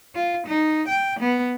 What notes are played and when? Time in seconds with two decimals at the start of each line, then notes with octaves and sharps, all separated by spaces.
0.15 F4
0.47 D#4
0.89 G5
1.20 B3